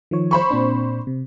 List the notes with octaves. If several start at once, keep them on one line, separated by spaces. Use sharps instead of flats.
D#3 F3 C#5
C5 B5 C#6
A#2 C4 D4
C3